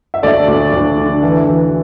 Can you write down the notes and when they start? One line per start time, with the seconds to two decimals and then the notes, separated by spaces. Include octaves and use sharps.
0.14 E5
0.23 D2 A4 D5
0.48 D2
0.73 D2 D4
0.98 D3
1.23 E3
1.48 E3